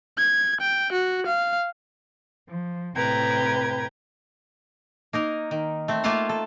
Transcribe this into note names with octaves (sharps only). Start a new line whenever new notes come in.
G#6
G5
F#4
F5
F3
A2 C3 B4 G5 A#5 G#6
A#3 D#4 A#4
D#3
A3 C4
A3 A#3 F4 A4 F5 F#5
A4